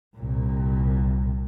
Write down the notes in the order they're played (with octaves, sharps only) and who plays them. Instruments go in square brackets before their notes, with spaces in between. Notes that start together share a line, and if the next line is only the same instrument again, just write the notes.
[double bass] C2 A#2